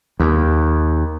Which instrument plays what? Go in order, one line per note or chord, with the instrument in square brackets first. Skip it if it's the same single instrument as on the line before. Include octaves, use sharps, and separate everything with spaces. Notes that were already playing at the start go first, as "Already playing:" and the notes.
[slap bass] D#2